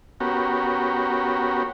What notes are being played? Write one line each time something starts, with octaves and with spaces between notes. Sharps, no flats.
B3 C#4 F#4 G4 A#4